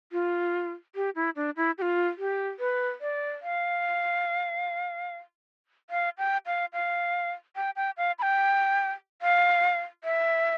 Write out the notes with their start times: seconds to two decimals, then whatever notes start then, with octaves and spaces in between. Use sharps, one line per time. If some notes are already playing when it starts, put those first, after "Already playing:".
0.12 F4
0.95 G4
1.15 E4
1.36 D4
1.56 E4
1.78 G4
1.82 F4
2.18 G4
2.59 B4
3.01 D5
3.42 F5
5.90 F5
6.18 G5
6.46 F5
6.73 F5
7.56 G5
7.76 G5
7.97 F5
8.19 B5
8.22 G5
9.22 F5
10.04 E5